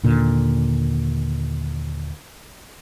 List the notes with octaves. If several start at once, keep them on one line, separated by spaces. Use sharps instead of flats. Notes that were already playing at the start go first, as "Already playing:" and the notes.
D#2 A#2 D3